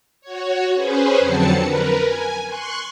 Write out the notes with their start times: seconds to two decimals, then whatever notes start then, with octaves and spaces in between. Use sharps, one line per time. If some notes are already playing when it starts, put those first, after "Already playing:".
0.21 F#4 C#5
0.74 C#4 G#4 B4 C5
1.19 F2 D3 F#3 C4 A5 C#7
1.61 A#4 B4
2.02 G#5
2.48 C6 C#6 F#6